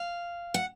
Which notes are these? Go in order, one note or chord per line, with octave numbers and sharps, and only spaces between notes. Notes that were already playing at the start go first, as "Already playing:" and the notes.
Already playing: F5
F#5